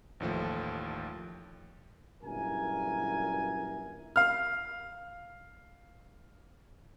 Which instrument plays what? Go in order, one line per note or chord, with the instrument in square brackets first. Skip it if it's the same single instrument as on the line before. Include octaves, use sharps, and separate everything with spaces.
[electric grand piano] A1 D#2 F3 A3
[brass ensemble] G1 F#2 A#2 E4 A#4 G#5
[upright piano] F5 F6